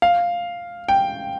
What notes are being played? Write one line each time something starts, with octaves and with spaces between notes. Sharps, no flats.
F5
G5